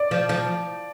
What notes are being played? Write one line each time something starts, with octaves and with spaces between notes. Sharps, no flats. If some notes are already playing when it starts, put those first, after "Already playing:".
Already playing: D5
F3
F3